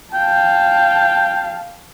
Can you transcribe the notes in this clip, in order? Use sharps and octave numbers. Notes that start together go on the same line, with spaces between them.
F5 G5 A5